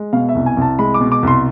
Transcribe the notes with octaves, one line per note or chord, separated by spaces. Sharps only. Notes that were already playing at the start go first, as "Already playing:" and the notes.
Already playing: G#3
B2 F5
E5
C2
G#5
C2 A5
G#3 B5
D6
B2
D6
C2 C6